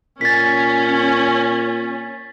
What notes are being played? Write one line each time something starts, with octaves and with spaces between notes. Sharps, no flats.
A#2 C#4 A6 B6